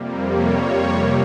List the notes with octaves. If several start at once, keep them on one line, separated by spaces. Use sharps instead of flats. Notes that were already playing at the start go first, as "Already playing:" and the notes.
Already playing: F2 C3 G3 A#3
C#5